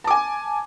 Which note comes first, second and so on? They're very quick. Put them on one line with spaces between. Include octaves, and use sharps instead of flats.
A5 D6 G#5